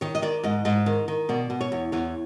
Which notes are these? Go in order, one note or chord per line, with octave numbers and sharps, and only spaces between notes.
D#3 C#5
D#5
D#3 D5
G#2 D#5
G#2 D#5
D#3
D#3
B2 D5
B2
C#5
E2
E2 C#5